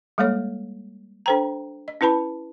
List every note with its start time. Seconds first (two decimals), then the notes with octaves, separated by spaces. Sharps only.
0.18 G3 G#3 A#3 A4 C#5
1.26 D4 A4 C5 G5 A#5
1.88 D#5
2.01 C#4 E4 B4 A5 B5